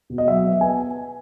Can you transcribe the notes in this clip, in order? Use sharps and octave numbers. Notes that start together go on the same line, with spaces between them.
B2
D#5
F#3 E5
B3
B3 G#5